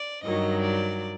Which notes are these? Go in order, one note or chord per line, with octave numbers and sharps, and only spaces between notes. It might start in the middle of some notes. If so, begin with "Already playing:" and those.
Already playing: D5
G2 D#3 F#3 D#5
D5